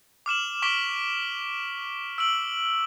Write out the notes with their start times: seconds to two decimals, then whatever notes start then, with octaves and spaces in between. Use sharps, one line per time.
0.26 D6 F6 E7 F#7
0.62 C#6 D6 B6 D7 G7
2.18 E6 D7 F#7